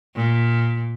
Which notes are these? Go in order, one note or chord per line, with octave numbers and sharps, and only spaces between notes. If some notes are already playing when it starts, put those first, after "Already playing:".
A#2